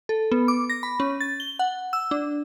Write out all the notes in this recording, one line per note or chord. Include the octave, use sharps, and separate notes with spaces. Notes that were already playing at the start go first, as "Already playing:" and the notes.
A4
B3
D6
A#6
B5
C#4
A6
G7
F#5
E6
D4